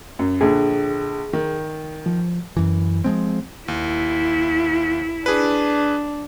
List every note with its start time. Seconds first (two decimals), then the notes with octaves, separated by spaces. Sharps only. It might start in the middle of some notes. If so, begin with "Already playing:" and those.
0.19 F#2
0.41 A#1 D3 G#4
1.33 D#3
2.06 F3
2.57 F#2 E3
3.04 F3 G#3 C4
3.68 D#2 E4
5.26 D4 G#4 B4